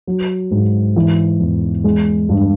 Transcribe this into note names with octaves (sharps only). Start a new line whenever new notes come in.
F#3
G#2
E3
E2
G#3
G2